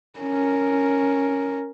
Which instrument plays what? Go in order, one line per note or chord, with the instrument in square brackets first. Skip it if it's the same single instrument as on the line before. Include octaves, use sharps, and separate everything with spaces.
[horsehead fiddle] C#4 A#4